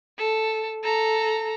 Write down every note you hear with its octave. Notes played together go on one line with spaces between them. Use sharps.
A4
A4 A#5